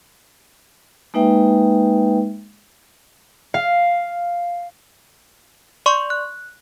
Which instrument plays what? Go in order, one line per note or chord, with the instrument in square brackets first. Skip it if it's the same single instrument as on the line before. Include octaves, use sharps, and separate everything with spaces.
[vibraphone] G#3 A#3 D#4 B4 E5 G5
[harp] F5
[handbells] D5 C6 C#6
F#6